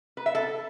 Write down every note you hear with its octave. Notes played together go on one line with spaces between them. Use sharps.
B4
E5
A4